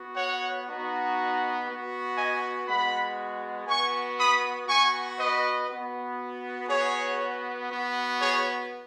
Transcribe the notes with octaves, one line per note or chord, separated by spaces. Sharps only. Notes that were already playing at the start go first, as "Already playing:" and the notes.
Already playing: B3 F#4
C#5 F#5
B3 D#4 F#4
F#4
B3
D#5 G#5
G#3 B3 F#4 F#5 B5
B3 F#4 G#5 C#6
B5 D#6
B3 F#4 G#5 C#6
B4 D#5
B3 F#4
B3 F#4 G#4 C#5
B3 F#4
G#4 C#5